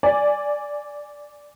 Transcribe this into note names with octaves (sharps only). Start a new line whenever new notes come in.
D5 G#5